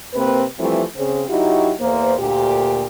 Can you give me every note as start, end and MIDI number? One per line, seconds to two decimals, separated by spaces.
0.14 0.44 48
0.14 0.44 58
0.14 0.44 60
0.14 0.44 71
0.59 0.82 52
0.59 0.82 53
0.59 0.82 55
0.59 0.82 57
0.59 0.82 60
0.59 0.82 64
0.96 1.24 49
0.96 1.24 60
1.28 1.73 54
1.28 1.73 63
1.28 1.73 64
1.28 1.73 66
1.28 1.73 67
1.80 2.13 40
1.80 2.13 58
1.80 2.13 72
2.19 2.85 38
2.19 2.85 46
2.19 2.85 67